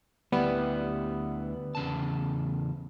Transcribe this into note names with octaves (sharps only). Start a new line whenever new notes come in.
D2 G3 B3 E4
E2 C#3 A5